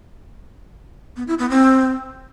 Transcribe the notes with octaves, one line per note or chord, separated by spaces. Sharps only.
B3
E4
B3
C4